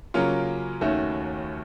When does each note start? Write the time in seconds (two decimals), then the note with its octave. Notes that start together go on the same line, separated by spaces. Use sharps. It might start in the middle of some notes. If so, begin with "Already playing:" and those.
0.14 C#3 F#3 A#3 C#4 F4
0.81 D#2 D#3 A3 C#4 F#4